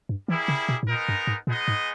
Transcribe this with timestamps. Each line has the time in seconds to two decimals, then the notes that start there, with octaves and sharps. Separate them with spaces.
0.09 G2
0.28 E3 G3 A#3 E4 G#4
0.48 C#3
0.69 B2
0.83 G#2
0.88 A#2 G#3 B3 D#4 A#4
1.09 G2
1.27 G#2
1.47 A#2 G#3 B3 D#4 G#4 D#5
1.68 G#2